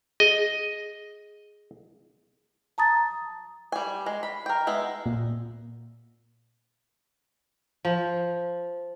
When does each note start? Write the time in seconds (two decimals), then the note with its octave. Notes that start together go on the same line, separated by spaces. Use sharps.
0.20 G#4 D#5
2.78 A5 A#5 D#6 A6
3.72 G3 G#5
4.06 G#3
4.23 B5
4.46 A#4 G5
4.67 G#3 B3 E5
5.06 A#2
7.85 F3